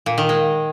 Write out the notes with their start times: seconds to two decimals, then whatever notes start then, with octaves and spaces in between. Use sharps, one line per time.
0.06 A#2
0.18 D#3
0.29 G#3